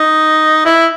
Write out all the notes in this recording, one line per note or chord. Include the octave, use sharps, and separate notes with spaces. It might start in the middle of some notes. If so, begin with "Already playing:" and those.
Already playing: D#4
E4